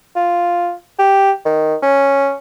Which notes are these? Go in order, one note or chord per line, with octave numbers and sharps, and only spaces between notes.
F4
G4
D#3
C#4